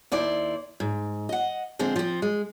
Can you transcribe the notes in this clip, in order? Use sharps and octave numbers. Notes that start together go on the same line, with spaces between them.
D#2 E4 C5 D5
G#2
D#5 F#5
D3 F3 G#3 C4
F3 C4
G#3